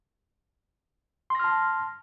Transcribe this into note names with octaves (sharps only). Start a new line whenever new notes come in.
A5 C6 F6 A#6